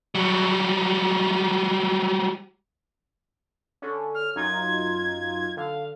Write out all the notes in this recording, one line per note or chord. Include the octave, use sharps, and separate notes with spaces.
F#3 G3
D3 C#4
F6
F#2 D#4 F4 G#6
D3 F5